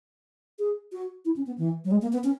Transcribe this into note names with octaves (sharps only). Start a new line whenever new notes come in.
G#4
F#4
E4
C#4
B3
E3
F#3
G#3
A#3
B3
C#4